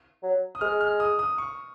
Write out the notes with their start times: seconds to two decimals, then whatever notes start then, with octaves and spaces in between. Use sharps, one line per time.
0.23 F#3
0.55 D#6
0.61 G#3 F6
0.81 F6
1.00 D#6
1.19 D#6
1.38 C#6